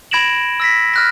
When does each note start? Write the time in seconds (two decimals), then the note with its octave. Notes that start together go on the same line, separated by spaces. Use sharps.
0.11 B5 G#6 A#6 D7 E7 F#7
0.60 E6 A#6 B6
0.94 F6 F#6 A#6